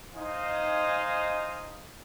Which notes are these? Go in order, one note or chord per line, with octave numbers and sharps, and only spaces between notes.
D#4 C5 D#5 F5 G#5